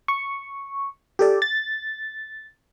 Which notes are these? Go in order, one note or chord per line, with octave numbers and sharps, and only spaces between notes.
C#6
G4 A4 D5
A6